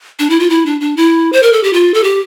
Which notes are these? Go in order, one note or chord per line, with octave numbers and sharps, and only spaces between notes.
D4
E4
F4
E4
D4
D4
E4
C5
A#4
A4
G4
F4
A4
G4